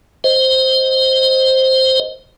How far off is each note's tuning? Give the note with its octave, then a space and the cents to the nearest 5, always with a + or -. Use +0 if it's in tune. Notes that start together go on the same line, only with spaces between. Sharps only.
C5 +0 D#5 +0